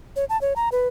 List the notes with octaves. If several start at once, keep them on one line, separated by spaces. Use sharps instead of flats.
C#5
A5
C#5
A#5
B4